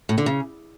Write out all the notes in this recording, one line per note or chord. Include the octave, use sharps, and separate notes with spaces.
A2
D3
C#3